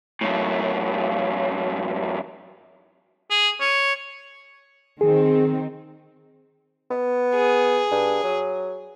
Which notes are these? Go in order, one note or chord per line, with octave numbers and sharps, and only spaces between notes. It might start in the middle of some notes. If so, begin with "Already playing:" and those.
F#2 A2
G#4
C#5
D#3 C4 G#4
B3
G#4
G2
F#3